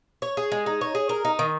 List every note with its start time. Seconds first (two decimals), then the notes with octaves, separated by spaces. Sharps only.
0.22 C#5
0.37 G#4
0.52 G#3
0.66 D#4
0.81 C#5
0.95 G#4
1.09 A#4
1.25 D#4
1.39 D#3